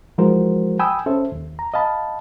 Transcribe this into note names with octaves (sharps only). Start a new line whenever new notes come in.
E3 F3 G#3 F#4 A#4 C5
G5 G#5 B5 D#6 E6
C#4 A4 C5 E5
D#2
A#5
D#5 F5 A5 B5